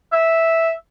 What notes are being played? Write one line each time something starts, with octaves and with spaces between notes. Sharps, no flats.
E5